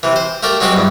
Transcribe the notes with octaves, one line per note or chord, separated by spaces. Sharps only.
C3 E3
C5
A3 G4 A#4 D5
F#3 G#3 C4 F#4 G4
E2 G2